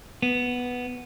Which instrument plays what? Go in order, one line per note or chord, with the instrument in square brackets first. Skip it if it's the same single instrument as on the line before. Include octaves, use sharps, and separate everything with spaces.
[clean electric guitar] B3